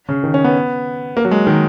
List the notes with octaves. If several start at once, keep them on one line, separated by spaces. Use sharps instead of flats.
C#3
D#3
C#4
B3
A#3
F#3
G#3
D#3